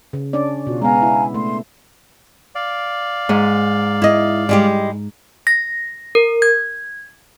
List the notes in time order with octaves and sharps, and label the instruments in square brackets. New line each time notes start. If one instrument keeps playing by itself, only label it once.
[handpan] C#3
C#4 D4 D5
[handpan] B2 [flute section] F4 F#4
[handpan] G#3 B3 [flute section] F5 G#5 A#5
[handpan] E4
[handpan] A3 [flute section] C6
[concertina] D5 F5
[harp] G#2
[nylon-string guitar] E4 D#5
G3 G#3 G4
[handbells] A#6
A#4
G#6